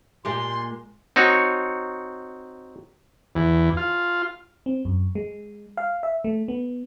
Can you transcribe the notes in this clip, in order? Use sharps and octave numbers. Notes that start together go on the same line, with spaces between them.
A#2 G#3 G4 C6
C4 D#4 F#4 C#5
E2
F4
C4
F#2
G#3
F5
E5
A3
B3